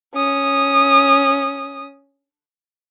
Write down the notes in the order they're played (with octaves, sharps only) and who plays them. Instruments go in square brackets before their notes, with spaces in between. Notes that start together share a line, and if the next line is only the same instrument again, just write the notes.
[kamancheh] C#4 D#6